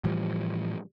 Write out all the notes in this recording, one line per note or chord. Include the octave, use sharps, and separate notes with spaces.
A2 E3 F3 G3